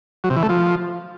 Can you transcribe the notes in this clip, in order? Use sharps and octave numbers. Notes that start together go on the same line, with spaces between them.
F#3
C3
E3
A3
F3